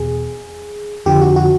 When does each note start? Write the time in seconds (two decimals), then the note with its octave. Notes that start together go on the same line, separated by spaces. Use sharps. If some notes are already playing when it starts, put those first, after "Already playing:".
Already playing: E2 B2 G#4
1.06 F2 D3 F3 G4
1.21 F#4
1.36 F#4